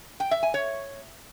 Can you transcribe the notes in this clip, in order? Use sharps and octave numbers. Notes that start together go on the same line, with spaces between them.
G5
E5
G#5
C#5